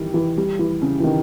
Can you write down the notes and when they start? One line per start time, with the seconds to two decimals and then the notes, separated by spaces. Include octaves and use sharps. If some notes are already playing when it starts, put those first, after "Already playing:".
Already playing: D#3 E3 G3
0.14 E3
0.37 G3
0.59 E3
0.82 C#3
1.00 E3
1.04 D#3